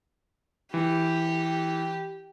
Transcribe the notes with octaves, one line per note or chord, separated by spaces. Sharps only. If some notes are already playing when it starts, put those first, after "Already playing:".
E3 G4